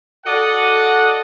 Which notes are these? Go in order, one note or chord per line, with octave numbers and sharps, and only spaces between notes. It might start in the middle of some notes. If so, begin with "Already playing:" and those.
F#4 A4 D5 D#5 F#5